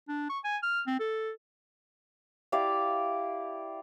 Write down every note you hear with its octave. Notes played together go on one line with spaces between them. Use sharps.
D4
C#6
G#5
F6
C4
A4
E4 G4 D5 F5